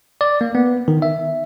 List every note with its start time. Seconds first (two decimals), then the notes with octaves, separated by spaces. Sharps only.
0.21 D5
0.41 A#3
0.55 B3
0.88 D#3
1.02 E5